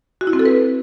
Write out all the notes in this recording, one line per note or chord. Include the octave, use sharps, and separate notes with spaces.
F#4
E4
C4
A4
B4